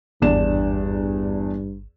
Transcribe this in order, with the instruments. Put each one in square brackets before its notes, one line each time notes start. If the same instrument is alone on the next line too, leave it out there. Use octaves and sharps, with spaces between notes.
[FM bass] G#1 [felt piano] E2 D4 E7 [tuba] G2